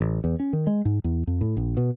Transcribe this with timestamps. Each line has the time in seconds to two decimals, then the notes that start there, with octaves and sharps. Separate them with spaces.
0.01 A1
0.24 E2
0.40 C#4
0.53 D#3
0.67 G#3
0.85 G#2
1.04 E2
1.27 F2
1.41 A2
1.57 A#1
1.77 B2